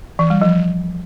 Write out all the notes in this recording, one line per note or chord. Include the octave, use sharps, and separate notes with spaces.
E3
G3
F3